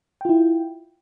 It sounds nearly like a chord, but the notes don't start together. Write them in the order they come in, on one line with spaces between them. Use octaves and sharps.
G5 F4 E4